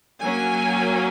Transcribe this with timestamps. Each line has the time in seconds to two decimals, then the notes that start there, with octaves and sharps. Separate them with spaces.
0.21 F#3 A#3 C#4 G#5